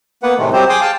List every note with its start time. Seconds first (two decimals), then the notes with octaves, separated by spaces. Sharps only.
0.23 A#3 B3 B4 F#5
0.38 A2 C3 D#3 G#3 A3
0.53 F#3 G3 C4 G4 C5
0.69 G#4 G5 C6 D6 D#6
0.81 F5 G5 A5